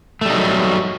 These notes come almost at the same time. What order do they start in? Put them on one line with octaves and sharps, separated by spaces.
A3 G3 D#4 F#3